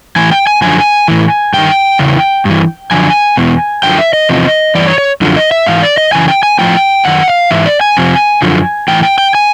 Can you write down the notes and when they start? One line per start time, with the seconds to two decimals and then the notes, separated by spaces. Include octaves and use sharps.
0.16 A2 E3 G#5
0.32 G5
0.47 G#5
0.62 F#2 D3 F3 G#5
1.08 A2 E3
1.53 G2 D#3 G5
1.99 E2 C#3 E3
2.45 G2 E3
2.91 F#2 D3 F3 G#5
3.37 E2 B2
3.83 F#2 D3 F3 G5
3.99 E5
4.13 D#5
4.29 E2 C3 F3
4.75 G2 E3 D5
4.87 C#5
4.98 C#5
5.21 F#2 D3 F3
5.37 D#5
5.51 E5
5.66 G#2 E3 F5
5.82 D5
5.98 D#5
6.12 F#2 C#3 E3 G#5
6.28 G5
6.43 G#5
6.59 A2 F3 G5
7.05 F#2 D#3 F#5
7.28 F5
7.51 G#2 E3 E5
7.66 D5
7.81 G#5
7.97 F2 C3 F3
8.42 F#2 D3 F3
8.88 A2 E3 G5
9.03 G5
9.18 G5
9.35 G#5